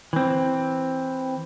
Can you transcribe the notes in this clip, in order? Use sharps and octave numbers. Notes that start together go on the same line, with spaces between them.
E3 C4